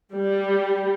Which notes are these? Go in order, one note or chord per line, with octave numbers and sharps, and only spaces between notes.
G3